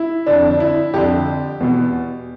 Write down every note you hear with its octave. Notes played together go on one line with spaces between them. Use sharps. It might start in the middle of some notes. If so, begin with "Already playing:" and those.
Already playing: E4
F2 D3 D4
D4
E4
F2 D3 G4
E2 B2